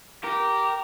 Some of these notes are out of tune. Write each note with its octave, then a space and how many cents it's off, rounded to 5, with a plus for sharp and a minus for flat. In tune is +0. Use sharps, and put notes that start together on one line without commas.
G4 -15 A#4 -5